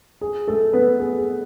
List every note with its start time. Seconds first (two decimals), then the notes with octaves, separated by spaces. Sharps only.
0.21 G#4
0.48 A3 A4
0.73 B3 B4
1.00 G#4
1.18 G#4